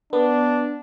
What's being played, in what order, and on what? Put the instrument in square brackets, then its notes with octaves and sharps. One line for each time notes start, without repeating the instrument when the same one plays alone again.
[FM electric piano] B3 [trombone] D4